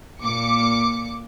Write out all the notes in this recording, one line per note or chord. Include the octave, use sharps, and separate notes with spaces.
A#2 D6 C#7